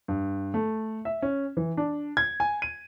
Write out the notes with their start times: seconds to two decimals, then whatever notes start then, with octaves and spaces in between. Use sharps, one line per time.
0.08 G2
0.54 A3
1.05 E5
1.22 C#4
1.57 E3
1.77 D4
2.17 G#6
2.40 G#5
2.62 D#7